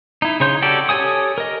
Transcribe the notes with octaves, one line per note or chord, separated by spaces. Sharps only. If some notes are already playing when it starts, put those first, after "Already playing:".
D#4 E4
C#3 D#4 C#5 C6 G6
C#4 F#4 G4 A4 D5
G4 A4 C#5 G#5 D#6
A#4 D#5